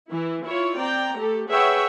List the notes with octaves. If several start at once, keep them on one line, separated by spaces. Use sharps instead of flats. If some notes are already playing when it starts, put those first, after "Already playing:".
E3 E4
E4 F4 C#5
C4 D5 G5 A#5
A3 G4 A4
G#4 B4 C#5 E5 F#5 G5